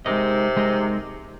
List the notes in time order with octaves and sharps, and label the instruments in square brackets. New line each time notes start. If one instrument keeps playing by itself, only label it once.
[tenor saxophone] C3 [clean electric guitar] G#3 D#4 A#4 D#5
[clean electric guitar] G#3 D#4 A#4 D#5